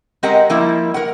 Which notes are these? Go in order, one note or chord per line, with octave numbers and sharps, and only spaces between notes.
G#3 C4 G4 A#4 D#5 F#5
F3 G3 A#3 E4
A#4 F#5